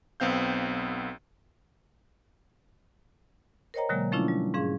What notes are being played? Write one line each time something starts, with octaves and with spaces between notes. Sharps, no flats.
B1 B3 C4 F5 G6
A#4 C5 C#5 D#5 G5 A#5
B2 D3 F#3 G#3 A#3
F3 A3 C#4 D4 E4 F4
G3
G#2 C#4 G#4 F5